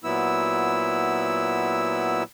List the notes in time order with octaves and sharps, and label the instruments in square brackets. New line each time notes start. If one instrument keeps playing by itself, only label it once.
[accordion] A#2 F#3 B3 E4 E6